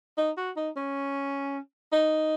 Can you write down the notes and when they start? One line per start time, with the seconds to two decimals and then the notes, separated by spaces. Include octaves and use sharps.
0.18 D#4
0.37 F#4
0.57 D#4
0.77 C#4
1.93 D#4